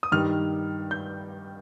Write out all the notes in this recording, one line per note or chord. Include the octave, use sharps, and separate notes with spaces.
D#6
G2 D#3 G3 F6
G6